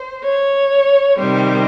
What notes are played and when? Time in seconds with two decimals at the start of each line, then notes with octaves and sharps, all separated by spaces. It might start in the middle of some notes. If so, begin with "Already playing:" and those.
Already playing: C5
0.22 C#5
1.18 C3 D#3 G3 C5